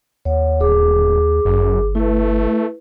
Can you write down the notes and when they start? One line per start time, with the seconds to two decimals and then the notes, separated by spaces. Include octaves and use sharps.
0.25 D#2 C#5 F#5
0.60 D1 G#4 D6
1.45 G1 F#2
1.95 A3 E4 B4